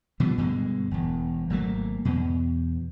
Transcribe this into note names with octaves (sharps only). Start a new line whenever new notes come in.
B2 E3 F3 G3
G2 B2 D3 G#3
E1 E2
G#1 F#3 A3 A#3
E2 B2